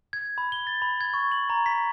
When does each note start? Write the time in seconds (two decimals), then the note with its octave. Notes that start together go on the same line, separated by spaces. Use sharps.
0.13 G#6
0.38 B5
0.52 G7
0.67 A6
0.82 B5
1.01 G#6
1.14 C#6
1.32 F#7
1.50 A#5
1.66 B6